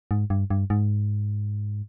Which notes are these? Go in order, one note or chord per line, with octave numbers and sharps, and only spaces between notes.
G#2
G2
G2
G#2